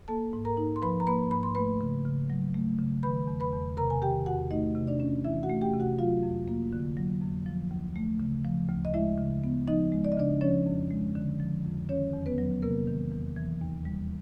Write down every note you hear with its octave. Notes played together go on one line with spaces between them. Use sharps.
A#3 A4 A5
G#2
A#4 A#5
D#4
C6
F3 B4 B5
A#5
A#3 B4 B5
G#2 B5
C6
A3 B4 B5
C#3
C#3
F#3
A3
C#3
D#3 B4 B5
E2
B4 B5
E2
C3 A#4 A#5
G#5
D#3 G4 G5
E2 F#4 F#5
A3 D#4 D#5
C3
D4 D5
C#4
E3 E4 E5
F#4 F#5
A3
G4 G5
C3
F#4 F#5
F#3 F4 F5
F2
A#3
D3
F#3
F2
F3
D2
A3
C#3
F3
D2
D#5
G#3 E4 E5
C#3
B3
F3 D#4 D#5
G#3
D5
D#5
C#3 D4 D5
F3 C#4 C#5
F2
G#3
D3
F3
F2
D#3 C#4 C#5
E2
B3 B4
F#3
C3 A#3 A#4
D#3
E2
E3
D#2
G3